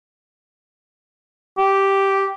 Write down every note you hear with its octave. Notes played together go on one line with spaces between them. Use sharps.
G4